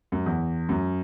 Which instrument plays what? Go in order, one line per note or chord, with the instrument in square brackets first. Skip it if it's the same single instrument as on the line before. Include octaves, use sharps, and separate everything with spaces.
[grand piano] F#2
E2
F#2